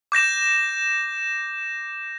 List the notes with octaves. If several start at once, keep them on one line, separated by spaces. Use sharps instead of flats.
D6 G6 A#6 E7